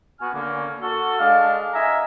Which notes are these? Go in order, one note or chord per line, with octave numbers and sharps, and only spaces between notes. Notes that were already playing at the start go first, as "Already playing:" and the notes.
B3 F#4 G#5 F6
D3 A#3 C#4
F#4 A4
G#3 D4 F5
D#5 E5 G#5 A#5